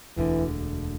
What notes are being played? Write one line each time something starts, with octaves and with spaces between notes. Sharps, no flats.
E1 D2 D3 E3